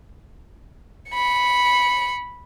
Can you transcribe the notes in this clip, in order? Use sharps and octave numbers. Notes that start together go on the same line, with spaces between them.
B5 C#7